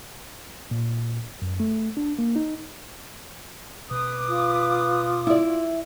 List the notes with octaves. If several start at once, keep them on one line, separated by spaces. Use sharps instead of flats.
A#2
F#2
A3
D4
A#3
D#4
B2 B4 D6 D#6
F4
E4 D5